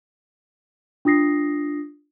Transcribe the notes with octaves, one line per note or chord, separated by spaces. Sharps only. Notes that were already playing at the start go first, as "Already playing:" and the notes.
D4 F4 D#6 A#6 C7